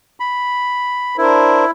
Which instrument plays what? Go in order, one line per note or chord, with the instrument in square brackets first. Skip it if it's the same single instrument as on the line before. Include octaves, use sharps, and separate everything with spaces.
[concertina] B5
[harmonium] D4 A#4 C5 [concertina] E4